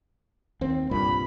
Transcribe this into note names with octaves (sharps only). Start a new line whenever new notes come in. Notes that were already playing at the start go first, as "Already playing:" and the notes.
D#2 C4
C2 G2 A#2 B5